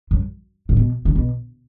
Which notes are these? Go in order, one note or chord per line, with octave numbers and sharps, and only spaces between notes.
F#2
A2
B2
D3
B2